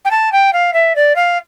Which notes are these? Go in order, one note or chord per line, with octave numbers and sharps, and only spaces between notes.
G5
A5
G5
F5
E5
D5
F5